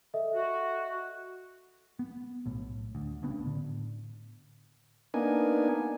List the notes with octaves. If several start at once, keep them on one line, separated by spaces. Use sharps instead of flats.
A4 D#5 E5
F#4
B3
B1 A2
D2
C2 C#3 B3 D4
A2 D3
A#3 B3 D4 D#4 G#5